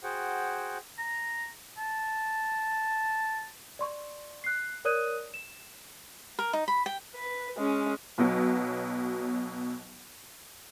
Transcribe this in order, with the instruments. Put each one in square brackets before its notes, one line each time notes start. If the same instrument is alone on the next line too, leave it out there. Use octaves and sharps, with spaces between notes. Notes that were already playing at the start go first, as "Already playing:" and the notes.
[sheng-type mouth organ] F#4 G#4 C5 F#5 G5
[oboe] A#5
A5
[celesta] D5 C6 C#6
F#6 C7
A#4 C#5 D5 D#6 F#6 D#7
E7
[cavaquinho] A#4
D#4
B5
G5
[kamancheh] B4
G#3 C#4
[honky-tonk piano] B1 B2 F#3